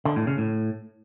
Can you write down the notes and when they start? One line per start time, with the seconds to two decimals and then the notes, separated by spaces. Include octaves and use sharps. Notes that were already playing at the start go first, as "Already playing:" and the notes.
0.05 D3
0.16 A2
0.27 C#3
0.38 A2